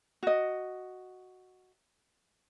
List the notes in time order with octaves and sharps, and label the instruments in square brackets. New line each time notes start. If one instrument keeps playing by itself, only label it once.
[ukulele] F#4 D#5